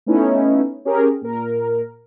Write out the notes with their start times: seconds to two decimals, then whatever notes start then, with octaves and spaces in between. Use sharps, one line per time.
0.06 A3 B3 C#4 D#4 E4
0.85 C#4 G4 G#4 A#4
1.22 A#2 A#4